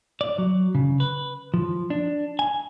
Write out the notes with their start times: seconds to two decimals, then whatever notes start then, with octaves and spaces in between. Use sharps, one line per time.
0.21 D5
0.38 F#3
0.75 C#3
1.00 B4
1.54 F3
1.90 D4
2.39 G#5